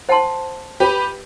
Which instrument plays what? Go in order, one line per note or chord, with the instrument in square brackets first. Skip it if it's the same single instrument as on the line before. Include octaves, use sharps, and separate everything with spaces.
[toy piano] C5 F#5 A5 C6
[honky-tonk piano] G4 B4